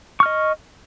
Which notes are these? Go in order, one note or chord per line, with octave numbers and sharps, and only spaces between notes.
D#5 C#6 F6